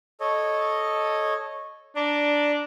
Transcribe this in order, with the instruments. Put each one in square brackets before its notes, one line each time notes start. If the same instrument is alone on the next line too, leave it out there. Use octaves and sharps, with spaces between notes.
[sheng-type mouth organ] A4 C#5 D#5
[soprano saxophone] D4 [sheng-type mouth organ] D5 A#5